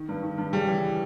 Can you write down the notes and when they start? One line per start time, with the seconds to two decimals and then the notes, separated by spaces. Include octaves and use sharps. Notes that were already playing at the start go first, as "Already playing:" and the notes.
Already playing: D#3
0.09 G2
0.23 D#3
0.38 G2
0.53 C#3 G3
0.68 E3